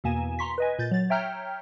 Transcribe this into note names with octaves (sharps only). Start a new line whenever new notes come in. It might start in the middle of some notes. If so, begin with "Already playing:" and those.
E2 B2 A#3 G#5 E7
A#5 C6 C#6 B6
B4 D#5 G#5
A#2 G6 A6
F#3 A6
C#5 E5 G5 A#5 F6 G6